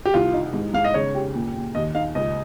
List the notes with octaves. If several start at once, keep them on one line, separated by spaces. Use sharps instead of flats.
G4
C2 F4
D#4
G#2
G#2 F5
D#5
C#3 C#5
G4
A#2
A#2
D#2 D#5
D#4 F5
C#2 D#5